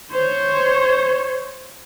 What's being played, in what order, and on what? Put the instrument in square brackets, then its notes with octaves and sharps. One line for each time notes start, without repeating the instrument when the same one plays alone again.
[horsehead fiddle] C5 C#5